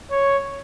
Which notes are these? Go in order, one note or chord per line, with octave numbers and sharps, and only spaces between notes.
C#5